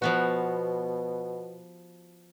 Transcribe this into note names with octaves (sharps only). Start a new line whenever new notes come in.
B2 F3 B3 F#4